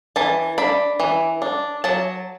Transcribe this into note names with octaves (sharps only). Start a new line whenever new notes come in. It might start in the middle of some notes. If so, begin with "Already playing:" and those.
E3 A5
D4 B5
E3
D4
F#3 A5